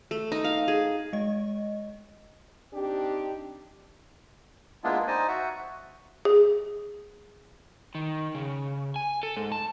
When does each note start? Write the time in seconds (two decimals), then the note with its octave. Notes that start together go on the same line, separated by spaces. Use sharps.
0.11 A3
0.32 D#4
0.44 F5
0.68 G#4
1.13 G#3 D#5
2.73 C4 D4 D#4 G4
4.84 G#3 A#3 B3 D4 E4 F4
5.08 D#4 C5 D5 D#5 G#5
5.28 F#4 E5 F#5
6.25 G#4
7.95 D#3
8.35 C#3
8.96 G#5
9.23 A4
9.37 G#2
9.52 A5